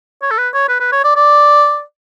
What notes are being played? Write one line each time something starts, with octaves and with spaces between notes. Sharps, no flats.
C#5
A4
B4
C#5
B4
B4
C#5
D5
D5